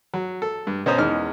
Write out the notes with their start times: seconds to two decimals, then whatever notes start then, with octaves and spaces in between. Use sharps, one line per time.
0.14 F#3
0.42 A4
0.67 G2
0.86 B2 C#4 C5 A#5 D#6
0.98 E2 D#3 G#3 C#4 F6